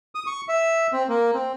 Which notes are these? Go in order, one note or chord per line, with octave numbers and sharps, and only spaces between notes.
D#6
C#6
E5
C4
A#3
C4